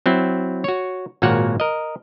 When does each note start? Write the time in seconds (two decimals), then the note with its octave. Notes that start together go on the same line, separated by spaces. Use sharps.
0.06 F#3 C4 E4
0.64 F#4 C#5
1.22 G#1 A#2 A#3 F#4 C#5 F#5
1.60 A#4 D#5